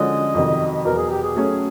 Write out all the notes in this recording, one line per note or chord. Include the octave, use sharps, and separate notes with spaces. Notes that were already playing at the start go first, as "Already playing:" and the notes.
Already playing: D3 F3 G#3 C#4 F#4 D#5
F2 C3 D#3 F#3
E2 B2 F#3 A#4
G#4
G4
G#4
F#3 A3 C#4